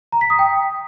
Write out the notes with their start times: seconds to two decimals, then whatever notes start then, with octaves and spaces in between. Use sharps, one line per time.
0.12 A#5
0.21 B6
0.30 D#6
0.39 G5